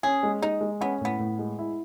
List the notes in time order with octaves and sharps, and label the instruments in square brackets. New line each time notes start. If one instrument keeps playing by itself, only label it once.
[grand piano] C#4 [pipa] G#4
[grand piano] G#3
[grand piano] G#3 [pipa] D#4
[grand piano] G#3
[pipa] B3 [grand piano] C#4
[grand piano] A2 [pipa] B3
[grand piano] A2
G#3
E4